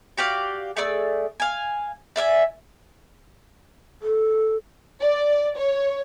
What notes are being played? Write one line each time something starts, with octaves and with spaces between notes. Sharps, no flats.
F#4 G4 D5 F5
A3 G#4 D5 E6
F5 G#5
D5 E5 F5 G#5
A4
D5
C#5